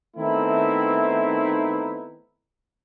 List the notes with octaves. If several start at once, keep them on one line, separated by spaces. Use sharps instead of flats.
D#3 A3 B3 C4 D#4 E4